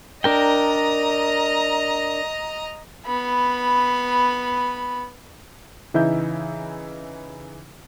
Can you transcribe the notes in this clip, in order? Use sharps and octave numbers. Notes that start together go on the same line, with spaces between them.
D4 A#4 D#5 G5 A#5
B3 B5
C#3 E3 D#4 E4 E5 G6